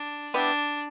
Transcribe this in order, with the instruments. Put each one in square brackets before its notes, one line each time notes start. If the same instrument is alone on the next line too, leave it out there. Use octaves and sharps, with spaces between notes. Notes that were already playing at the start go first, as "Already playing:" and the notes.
Already playing: [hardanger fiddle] D4
[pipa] B3 E4 G4 [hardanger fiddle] D4